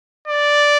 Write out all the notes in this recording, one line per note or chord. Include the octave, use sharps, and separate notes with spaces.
D5